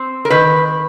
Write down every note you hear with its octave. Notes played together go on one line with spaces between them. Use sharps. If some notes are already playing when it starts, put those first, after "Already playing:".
Already playing: C4
A#4
D#3 B4